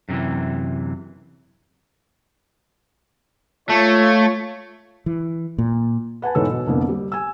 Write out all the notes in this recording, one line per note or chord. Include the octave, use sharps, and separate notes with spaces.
F#2 C3 D#3 E3
A3 F4 C#5
E3
A#2
B4 F#5 G#5 A5
E1 G#2 E3 A4 C#5 E6
B2
C2 F2 D3 A#3 B3
G3
G#5 E6